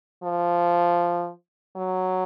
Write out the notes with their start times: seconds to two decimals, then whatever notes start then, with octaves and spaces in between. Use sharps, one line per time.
0.23 F3
1.76 F#3